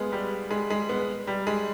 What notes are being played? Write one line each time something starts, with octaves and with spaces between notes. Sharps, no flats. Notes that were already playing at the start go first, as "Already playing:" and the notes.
Already playing: G#3 B3 F4
G3
G#3
G#3
B3
G3
G#3